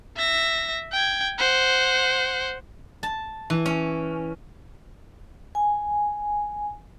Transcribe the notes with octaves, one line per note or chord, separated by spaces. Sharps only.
E5 A#6
G5 G#6
C5 F#5
A5
E3
C#4
G#5